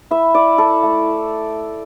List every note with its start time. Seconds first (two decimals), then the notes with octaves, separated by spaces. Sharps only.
0.11 E4 E5
0.34 E4 D5
0.58 E4 A4
0.83 A3